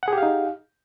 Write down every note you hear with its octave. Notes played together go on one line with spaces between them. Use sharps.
D#4 G4 G#4 F5 F#5